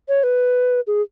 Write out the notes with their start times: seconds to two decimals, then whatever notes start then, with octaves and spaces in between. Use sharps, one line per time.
0.09 C#5
0.23 B4
0.87 G#4